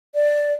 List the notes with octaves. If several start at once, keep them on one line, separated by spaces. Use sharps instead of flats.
D5